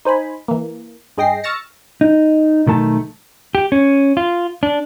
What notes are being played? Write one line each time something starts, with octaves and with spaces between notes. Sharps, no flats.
D#4 C5 G#5 B5
E3 A#3
G2 G#4 D#5 G5 A#6 C7
C#6 E6 F6 A6 A#6 C#7
D#4
B1 D#3 A3 A5
G4
C#4
F4
D4